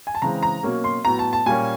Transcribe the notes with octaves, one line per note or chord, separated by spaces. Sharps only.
G#5
A5
C#3 E3 G#3 C4 A#5
A#5
B2 F#3 A#3 C#4
C6
A2 F#3 B3 A#5
A5
A5
A#2 G3 A#3 C#4 G#5